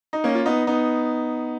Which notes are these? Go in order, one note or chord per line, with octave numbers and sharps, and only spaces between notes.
D#4
A#3 C#4
F4
B3 D#4
B3 D#4